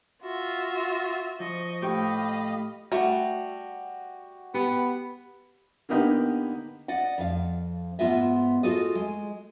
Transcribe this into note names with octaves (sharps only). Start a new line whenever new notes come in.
F4 F#4 E5
F3 D#5 C#6
A2 G4 D#5 F5 B5 C#6
G3 A3 F#4
B3 G4
D3 A#3 B3 D#4 G4 B4
D5 D#5 F#5
F2 F5
G#2 B3 F4 D#5 E5
F4 F#4 G#4 A4 D#5
G#3